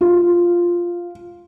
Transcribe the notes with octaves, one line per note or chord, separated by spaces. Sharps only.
F4